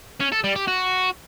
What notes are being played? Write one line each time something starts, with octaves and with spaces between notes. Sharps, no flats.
C#4
A4
G3
G4
F#4